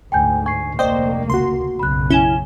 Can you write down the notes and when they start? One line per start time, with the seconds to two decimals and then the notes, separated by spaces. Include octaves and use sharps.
0.12 D2 G#2 G5 G#5 G6
0.46 G#5 C#6 C7
0.79 F1 D2 A#3 C5 D5 D#5 G5
1.30 C#2 F#4 C6
1.79 B1 F#2 C#3 B5 F#6
2.10 C#4 E4 G#5 E7 G7